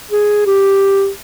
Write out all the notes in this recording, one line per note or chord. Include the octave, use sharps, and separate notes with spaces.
G#4
G4